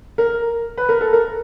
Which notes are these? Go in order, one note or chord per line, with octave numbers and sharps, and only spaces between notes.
A#4
B4
A#4
A4
A#4